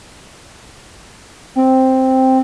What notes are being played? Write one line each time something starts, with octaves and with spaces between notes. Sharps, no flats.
C4